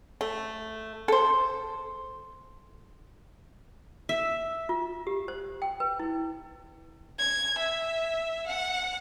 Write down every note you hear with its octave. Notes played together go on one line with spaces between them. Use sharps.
A3
A4 C5
E5
F4
G4
C5
G5
B4
E4
G#6
E5
F#5